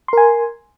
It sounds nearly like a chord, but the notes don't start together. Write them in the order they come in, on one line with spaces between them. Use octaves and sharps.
C6 A#4 G#5